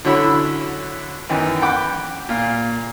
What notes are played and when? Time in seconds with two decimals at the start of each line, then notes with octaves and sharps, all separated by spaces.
0.05 D3 F#3 C#4 E4 E5 B5
1.29 F#2 D#3 E3
1.62 F#5 G5 B5 D6
2.29 A#2 F5